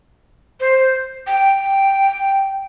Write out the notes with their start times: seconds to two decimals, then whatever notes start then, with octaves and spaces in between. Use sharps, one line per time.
0.60 C5
1.27 G5